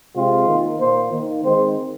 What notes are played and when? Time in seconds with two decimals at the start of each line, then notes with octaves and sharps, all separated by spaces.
0.14 C3 G#3 C4 F4
0.46 D#3 A#3
0.78 A#2 A#3 C5
1.11 D#3 A#3
1.42 D#3 G#3 C4 C5